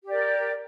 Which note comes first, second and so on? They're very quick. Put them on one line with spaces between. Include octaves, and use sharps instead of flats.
G4 D5 A#4